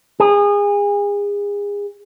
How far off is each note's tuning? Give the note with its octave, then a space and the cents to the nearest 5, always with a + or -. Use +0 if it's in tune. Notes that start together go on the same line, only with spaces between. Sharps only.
G#4 -30